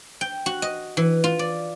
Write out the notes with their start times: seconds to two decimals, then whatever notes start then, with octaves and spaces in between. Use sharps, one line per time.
0.21 G5
0.46 F#4
0.62 D#5
0.97 E3
1.24 F4
1.39 D5